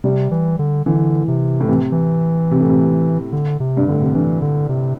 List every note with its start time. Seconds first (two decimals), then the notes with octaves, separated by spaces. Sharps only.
0.04 C3 G3
0.31 E3
0.59 D3
0.86 D3 E3
1.28 C3
1.60 A2
1.68 C3 E3
1.92 E3
2.51 C3
2.60 A2
2.69 C3
3.32 D3
3.60 C3
3.77 G2
3.88 A2 D3
4.02 C3
4.15 D3 E3
4.42 D3
4.69 C3